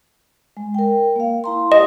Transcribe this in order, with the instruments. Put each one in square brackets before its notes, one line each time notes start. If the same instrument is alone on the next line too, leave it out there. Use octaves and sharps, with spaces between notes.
[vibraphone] G#3
A#4 G5
A#3 F5
E4 A#5 C6
[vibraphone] G4 D#6 [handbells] D#5